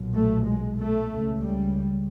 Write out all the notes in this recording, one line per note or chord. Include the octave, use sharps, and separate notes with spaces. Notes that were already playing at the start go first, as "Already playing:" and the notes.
Already playing: B1 A#2
A3
G#3
A3
C#2 C#3
G3